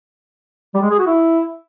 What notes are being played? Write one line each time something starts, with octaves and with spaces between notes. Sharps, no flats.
G3
G#3
G#4
F#4
E4